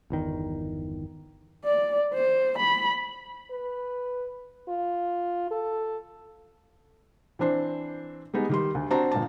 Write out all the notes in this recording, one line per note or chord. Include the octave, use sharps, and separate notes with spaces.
G1 E2 D#3
D5
C5
B5
B4
F4
A4
E3 C4 D4 C5
G3 G#3 B3 D#4
D#3 G3 C6
D2
C4 D4 F#4 A5 A#5
G1 A#2 A5